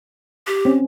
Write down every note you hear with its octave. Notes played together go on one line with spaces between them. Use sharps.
G4
C4 C#4